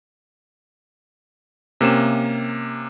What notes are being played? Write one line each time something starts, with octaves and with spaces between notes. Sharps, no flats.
C3 A#3 C#4 E7